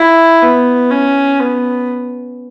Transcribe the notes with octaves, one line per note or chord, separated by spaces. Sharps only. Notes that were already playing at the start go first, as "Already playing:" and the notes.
Already playing: E4
B3
C#4
B3